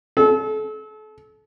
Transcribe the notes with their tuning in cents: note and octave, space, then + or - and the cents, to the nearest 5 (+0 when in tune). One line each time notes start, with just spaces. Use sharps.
A4 -35